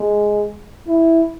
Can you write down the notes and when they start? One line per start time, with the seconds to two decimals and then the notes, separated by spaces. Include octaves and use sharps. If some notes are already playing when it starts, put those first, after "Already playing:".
Already playing: G#3
0.88 E4